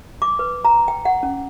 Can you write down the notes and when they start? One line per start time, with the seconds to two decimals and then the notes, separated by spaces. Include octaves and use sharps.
0.22 D6
0.39 B4
0.65 A#5
0.88 G5
1.05 F#5
1.23 C#4